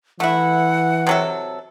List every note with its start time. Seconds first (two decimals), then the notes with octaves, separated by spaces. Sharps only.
0.20 E3 A3 E4 F#5
1.07 C3 F#3 A4